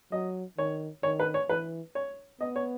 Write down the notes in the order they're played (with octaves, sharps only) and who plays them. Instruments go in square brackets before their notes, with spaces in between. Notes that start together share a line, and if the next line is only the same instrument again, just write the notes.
[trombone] F#3 [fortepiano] D#5
[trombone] D#3 [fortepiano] C#5
[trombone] D#3 [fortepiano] C#5
[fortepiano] B4
C#5
[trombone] E3 [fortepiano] B4
[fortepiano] C#5
[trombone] B3 [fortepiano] D#5
[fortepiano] C#5